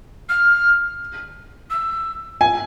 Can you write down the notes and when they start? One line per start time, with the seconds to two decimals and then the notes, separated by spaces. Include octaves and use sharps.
0.29 F6
1.70 E6
2.41 G#5